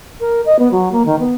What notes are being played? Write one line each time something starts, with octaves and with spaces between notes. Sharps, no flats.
A#4
D#5
B3
F#3
A#3
D#3
B3